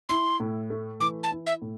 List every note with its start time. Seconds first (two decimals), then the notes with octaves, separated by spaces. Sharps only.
0.09 E4 C6
0.40 A2
0.70 A3
1.00 E3 D6
1.23 A5
1.32 E4
1.47 E5
1.62 A2